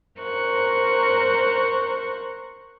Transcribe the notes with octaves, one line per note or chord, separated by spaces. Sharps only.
A#4 C5 C#6 F#6